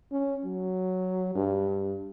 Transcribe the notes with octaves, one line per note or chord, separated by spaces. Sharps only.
C#4
F#3
G2